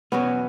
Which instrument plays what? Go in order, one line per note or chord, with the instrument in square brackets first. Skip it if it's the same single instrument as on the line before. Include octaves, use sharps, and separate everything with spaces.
[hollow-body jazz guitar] E2 B2 F#3 C#4 [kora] B3